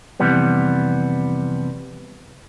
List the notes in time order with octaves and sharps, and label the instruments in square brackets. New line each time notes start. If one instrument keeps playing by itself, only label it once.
[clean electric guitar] F2 C3 E3 G3 B3